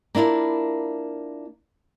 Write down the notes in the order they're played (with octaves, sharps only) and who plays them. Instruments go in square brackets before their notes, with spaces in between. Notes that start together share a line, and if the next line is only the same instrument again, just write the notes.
[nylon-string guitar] A#3 D4 E4 F4 A#4